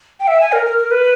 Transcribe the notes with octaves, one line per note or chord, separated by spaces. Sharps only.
G5
E5
G#5
A#4
A#4
A#4
B4